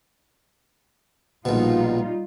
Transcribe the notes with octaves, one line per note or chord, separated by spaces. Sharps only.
A#1 B2 G3 D#4 F4